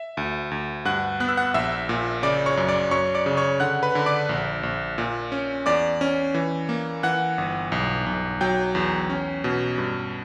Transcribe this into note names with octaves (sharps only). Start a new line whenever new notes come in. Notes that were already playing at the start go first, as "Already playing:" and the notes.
Already playing: E5
D2
D2
G2 F#5 F#6
B3 F#6
E6
F#5 F#6
A#1 E5 E6
A#2
C#3 D5 D6
C#5 C#6
F#2
D5 D6
F#2 C#5 C#6
D5 D6
C#3
C#5 C#6
D3 F#5 F#6
B4 B5
D3
D5 D6
A#1
A#1
A#2
C#4
E2 D5 D6
C#4
E3
A#3
E3 F#5 F#6
G1
B1
B1
F#3 G5 G6
E2
C#4
B2
G2